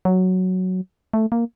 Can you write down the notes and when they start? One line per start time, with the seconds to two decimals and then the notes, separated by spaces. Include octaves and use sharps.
0.05 F#3
1.14 A3
1.32 A#3